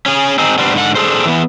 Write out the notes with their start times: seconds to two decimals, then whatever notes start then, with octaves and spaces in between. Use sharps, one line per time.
0.06 C#4 G#4
0.38 C4 D#4 G#4
0.58 G3 B3 C4 D4
0.74 G#2 D3 F#5
0.95 D4 G#4 A4 C5
1.25 E3 B3